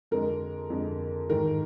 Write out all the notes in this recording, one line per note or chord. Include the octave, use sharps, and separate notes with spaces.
F2 D3 G#3 A#4
F2 D3 G#3
G#2 D#3 G#3 A#4